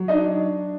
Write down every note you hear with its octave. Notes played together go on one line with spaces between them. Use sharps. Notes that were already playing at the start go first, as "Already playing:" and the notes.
Already playing: F#3
D4 D#4 D#5